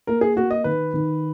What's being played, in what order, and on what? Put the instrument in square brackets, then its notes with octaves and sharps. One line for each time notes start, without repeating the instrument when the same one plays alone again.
[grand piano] A#3 [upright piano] A#4
[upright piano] G#4
[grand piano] A#3 [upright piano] F#4
[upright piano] D#5
[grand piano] D#3 [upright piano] B4
[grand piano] D#3